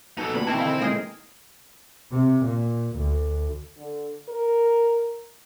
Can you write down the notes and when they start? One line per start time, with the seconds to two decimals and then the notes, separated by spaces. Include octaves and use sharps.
0.18 B2 D#4 A4
0.35 D2 A#2 G3 B3 B5
0.47 B2 D#3 E3 C4 E4 A5
0.58 D3 F5 B5
0.81 A#2 G#3 D#4 G#4 A#4
2.11 C3
2.46 A#2
2.97 D2
3.78 D3
4.29 A#4